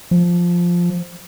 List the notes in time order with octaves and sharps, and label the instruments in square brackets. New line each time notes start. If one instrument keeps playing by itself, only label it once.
[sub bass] F3